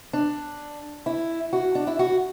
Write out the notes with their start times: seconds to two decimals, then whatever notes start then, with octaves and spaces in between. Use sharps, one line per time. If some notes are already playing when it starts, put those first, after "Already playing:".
0.13 D4
1.06 E4
1.53 F#4
1.75 D4
1.87 E4
1.99 F#4